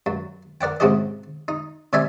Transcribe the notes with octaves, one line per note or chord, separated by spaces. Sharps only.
F#2
A#4 D5 F#5 G5
G#2 C3 C#4 F#4 G4 D#5
D#4
C3 G3 D5 E5 G#5 A#5